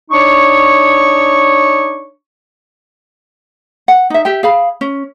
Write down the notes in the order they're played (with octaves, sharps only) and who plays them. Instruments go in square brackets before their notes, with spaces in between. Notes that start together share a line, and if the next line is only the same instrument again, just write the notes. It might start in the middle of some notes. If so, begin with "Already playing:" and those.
[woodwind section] D4 D#4 C#5 C#6
[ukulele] F#5
D#4 E5
G4 E5 G5
G#4 F5 B5
C#4